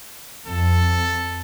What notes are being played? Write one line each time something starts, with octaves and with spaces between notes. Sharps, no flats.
F2 A4